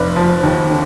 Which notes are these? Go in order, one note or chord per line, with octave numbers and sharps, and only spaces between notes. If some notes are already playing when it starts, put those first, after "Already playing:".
Already playing: F1 B4 D5
F3
D#2
D3